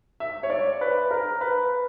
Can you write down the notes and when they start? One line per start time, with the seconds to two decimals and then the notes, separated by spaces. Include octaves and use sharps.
0.20 E5
0.43 C#5
0.50 D5
0.81 B4
1.11 A#4
1.41 B4